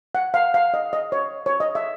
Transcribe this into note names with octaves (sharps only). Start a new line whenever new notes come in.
F#5
F5
F5
D#5
D#5
C#5
C#5
D#5
E5